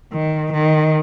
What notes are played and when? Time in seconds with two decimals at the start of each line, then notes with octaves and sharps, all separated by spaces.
0.12 D#3
0.53 D#3